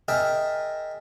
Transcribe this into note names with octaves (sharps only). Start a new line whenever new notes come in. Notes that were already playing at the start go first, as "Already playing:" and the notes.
G#4 A#4 D#5 E5 G5 A5